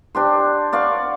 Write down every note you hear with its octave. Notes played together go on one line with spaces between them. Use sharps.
D4 G4 C5
D5 F5 F#5 C#6